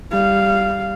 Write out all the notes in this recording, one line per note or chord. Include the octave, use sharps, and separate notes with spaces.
G3 F5